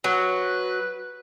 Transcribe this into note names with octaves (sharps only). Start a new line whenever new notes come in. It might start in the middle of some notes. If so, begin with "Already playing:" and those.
F#3 B4